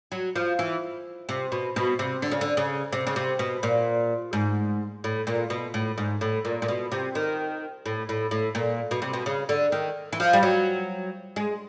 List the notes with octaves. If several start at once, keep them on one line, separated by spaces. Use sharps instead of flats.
F#3
F3
E3
C3
B2
B2
C3
D3
C#3
D3
C#3
C3
C#3
C3
B2
A#2
G#2
A2
A#2
B2
A2
G#2
A2
A#2
A#2
B2
C3
D#3
A2
A2
A2
A#2
B2
C3
B2
C#3
D3
D#3
E3
F3
G3
F#3
G#3